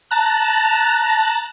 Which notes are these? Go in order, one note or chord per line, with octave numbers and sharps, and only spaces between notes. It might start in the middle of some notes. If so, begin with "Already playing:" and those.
A5 A#5 F#6